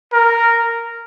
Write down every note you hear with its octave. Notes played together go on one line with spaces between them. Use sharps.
A#4